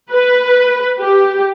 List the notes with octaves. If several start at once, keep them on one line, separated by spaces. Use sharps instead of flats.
B4
G4